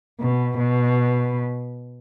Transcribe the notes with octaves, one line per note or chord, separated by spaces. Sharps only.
B2
B2